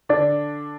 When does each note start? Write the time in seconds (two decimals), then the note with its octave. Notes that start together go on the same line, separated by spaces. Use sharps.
0.09 D3 D4 D5